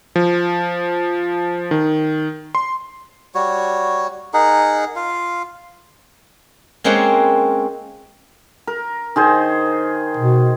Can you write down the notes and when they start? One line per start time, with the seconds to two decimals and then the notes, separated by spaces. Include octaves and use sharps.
0.16 F3
1.71 D#3
2.55 C6
3.35 G3 F#4 C#5
4.34 D#4 G#4 A#4 F#5
4.96 F4 F5
6.84 G#3 A#3 C4 C#4 F#5 G5
8.67 A#4
9.16 D#3 G#4 C5
10.17 B2